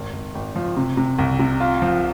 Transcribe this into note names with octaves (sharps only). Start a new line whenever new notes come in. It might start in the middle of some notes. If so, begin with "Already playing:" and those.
Already playing: G#1
G#1
G#1
F3
C3
C3
C2
C3
F4
F3